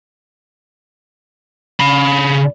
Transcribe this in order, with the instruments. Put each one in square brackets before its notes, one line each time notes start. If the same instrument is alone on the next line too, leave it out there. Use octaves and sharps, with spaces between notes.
[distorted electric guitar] C#3 B5